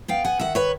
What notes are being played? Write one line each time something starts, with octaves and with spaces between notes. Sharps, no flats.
B3 F5 G5
F#5 G#5
D#3 E5 F#5
B4 C#5